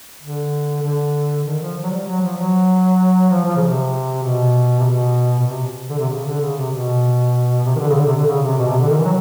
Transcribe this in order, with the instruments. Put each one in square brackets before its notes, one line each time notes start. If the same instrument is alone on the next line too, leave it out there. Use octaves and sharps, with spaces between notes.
[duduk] D3
D3
D#3
F3
F#3
G3
F#3
F3
F#3
F3
F3
C#3
C3
B2
C3
B2
B2
C3
D3
C3
C#3
D3
C#3
C3
B2
C3
D#3
D3
C#3
D3
C3
D3
C#3
C3
B2
C3
D3
D#3
E3
F#3